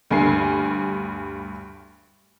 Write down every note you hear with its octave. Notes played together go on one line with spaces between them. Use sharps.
D2 G2 G#5 C7